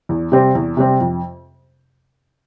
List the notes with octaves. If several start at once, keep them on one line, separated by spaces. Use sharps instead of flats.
E2
C3 G3 C4 G4
E2
C3 G3 C4 G4
F2